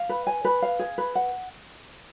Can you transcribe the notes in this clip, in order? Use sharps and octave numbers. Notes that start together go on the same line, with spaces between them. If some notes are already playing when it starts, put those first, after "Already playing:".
Already playing: F5
B4
G#5
B4
F5
G#4
B4
F#5